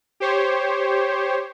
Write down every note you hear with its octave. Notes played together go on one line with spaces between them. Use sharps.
G4 C5 C#5